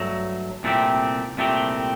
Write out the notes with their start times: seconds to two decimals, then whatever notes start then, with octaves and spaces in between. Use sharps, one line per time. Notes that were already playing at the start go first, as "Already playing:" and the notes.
Already playing: G2 F#3 A3
0.63 C2 A#2 A3 C4 G4
1.37 C2 A#2 A3 C4 G4